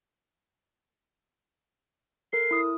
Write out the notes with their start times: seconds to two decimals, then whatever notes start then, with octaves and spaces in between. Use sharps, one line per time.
2.33 A4 A#4 C7
2.51 E4 D#6